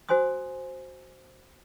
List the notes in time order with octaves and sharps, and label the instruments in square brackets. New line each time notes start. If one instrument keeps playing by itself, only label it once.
[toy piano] F#4 C5 G#5 C6 D#6